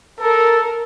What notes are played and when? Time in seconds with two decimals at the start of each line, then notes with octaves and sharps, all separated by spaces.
0.21 A4 A#4